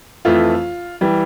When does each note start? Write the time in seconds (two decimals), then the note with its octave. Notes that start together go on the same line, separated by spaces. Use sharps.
0.25 F2 E3 A3 F4
1.01 E3 G3